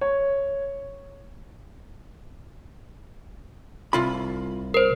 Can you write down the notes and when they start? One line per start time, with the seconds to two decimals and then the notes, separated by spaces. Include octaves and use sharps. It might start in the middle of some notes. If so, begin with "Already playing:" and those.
0.01 C#5
3.93 C2 F4 B5
4.74 A#4 C5